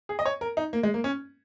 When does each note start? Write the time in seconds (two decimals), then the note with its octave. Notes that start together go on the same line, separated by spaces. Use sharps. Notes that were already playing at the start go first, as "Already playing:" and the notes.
0.09 G#4
0.19 D#5
0.26 C#5
0.41 A#4
0.57 D#4
0.73 A#3
0.83 G#3
0.94 A#3
1.04 C#4